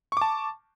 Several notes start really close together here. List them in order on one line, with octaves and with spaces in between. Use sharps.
C#6 D6 A5